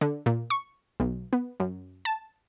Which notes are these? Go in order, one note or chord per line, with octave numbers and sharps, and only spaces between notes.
D3
A#2
C#6
B1
B3
F#2
A5